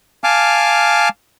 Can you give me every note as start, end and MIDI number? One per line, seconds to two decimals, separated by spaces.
0.24 1.09 77
0.24 1.09 80
0.24 1.09 81
0.24 1.09 86
0.24 1.09 89